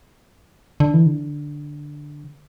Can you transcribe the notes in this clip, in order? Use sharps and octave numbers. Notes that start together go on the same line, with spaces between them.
D3
E3
D3